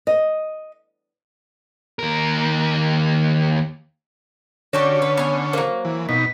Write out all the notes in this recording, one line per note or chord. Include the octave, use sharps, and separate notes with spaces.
D#5
D#2 A#4
D3 C#4 F#4 G4 C#5 D5 C#6
B4
B3 G#5
F#3 A#3 C5
E3
B2 D#4 B6